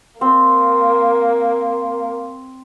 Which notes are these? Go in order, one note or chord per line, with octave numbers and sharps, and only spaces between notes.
A#3 C4